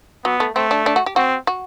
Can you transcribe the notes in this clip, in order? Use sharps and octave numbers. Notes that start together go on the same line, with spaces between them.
F#3 B3
A3
A3 C4
D4
D4
F#4
G4
C4 F#4
F#4